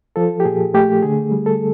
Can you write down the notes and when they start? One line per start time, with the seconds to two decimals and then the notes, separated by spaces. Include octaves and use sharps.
0.16 F3 A4
0.40 G4
0.45 A#2 G#4
0.74 A3 G4
1.02 D3 G#4
1.31 G3
1.46 A4